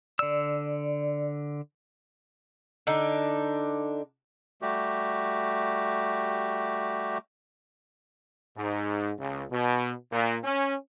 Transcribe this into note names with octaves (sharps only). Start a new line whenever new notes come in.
D3 D5 E6
D3 D4 D#4
G3 A3 F#4 G4
G#2
C#2
B2
A#2
C#4